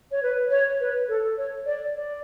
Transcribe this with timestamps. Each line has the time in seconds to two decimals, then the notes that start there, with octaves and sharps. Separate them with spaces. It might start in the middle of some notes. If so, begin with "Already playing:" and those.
0.12 C#5
0.23 B4
0.51 C#5
0.80 B4
1.08 A4
1.38 C#5
1.66 D5
1.95 D5